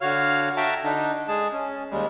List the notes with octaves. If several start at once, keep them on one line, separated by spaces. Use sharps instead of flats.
D3 F#4 C#5 F5 F6
F#4 E5 G5 A5 A#5
D3 D4 D#4
G#3 G#4 A5
C#4
D#2 G3 G#3